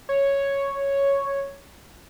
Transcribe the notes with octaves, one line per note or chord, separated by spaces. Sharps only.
C#5